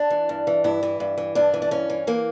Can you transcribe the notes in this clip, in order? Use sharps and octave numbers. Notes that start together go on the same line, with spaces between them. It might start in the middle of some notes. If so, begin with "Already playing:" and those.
Already playing: D4
E3
G2
E3
G2 E4
E3
G2
E3
G2 D4
E3
D4
G2 C#4
E3
E3 A#3